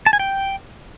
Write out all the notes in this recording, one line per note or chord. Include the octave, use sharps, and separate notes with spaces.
A5
G#5
G5